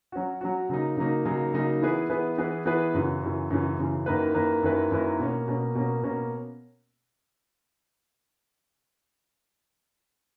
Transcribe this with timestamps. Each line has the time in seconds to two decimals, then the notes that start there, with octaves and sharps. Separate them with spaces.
0.12 F#3 C#4 F#4
0.41 F#3 C#4 F#4
0.69 C#3 F#3 A#3 D#4
0.97 C#3 F#3 A#3 D#4
1.25 C#3 F#3 A#3 D#4
1.54 C#3 F#3 A#3 D#4
1.82 E3 B3 E4 G#4 B4
2.10 E3 B3 E4 G#4 B4
2.38 E3 B3 E4 G#4 B4
2.66 E3 B3 E4 G#4 B4
2.94 F#2 C#3 E3
3.22 F#2 C#3 E3
3.50 F#2 C#3 E3
3.79 F#2 C#3 E3
4.06 F#2 D#3 A#3 E4 B4
4.34 F#2 D#3 A#3 E4 B4
4.63 F#2 D#3 A#3 E4 B4
4.91 F#2 D#3 A#3 E4 B4
5.19 B2 A#3 C#4
5.48 B2 A#3 C#4
5.75 B2 A#3 C#4
6.03 B2 A#3 C#4